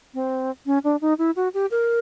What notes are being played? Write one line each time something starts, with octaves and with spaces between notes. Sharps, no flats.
C4
C#4
D4
D#4
E4
F#4
G4
A#4